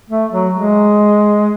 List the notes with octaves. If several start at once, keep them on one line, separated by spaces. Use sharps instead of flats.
A3
F#3
G#3